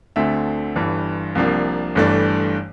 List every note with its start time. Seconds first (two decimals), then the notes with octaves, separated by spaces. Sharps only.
0.16 D2 D3 A3 C4 E5
0.76 G1 G2 E3
1.35 C2 C3 F3 A#3 D4
1.95 G1 G2 E3 A3 D4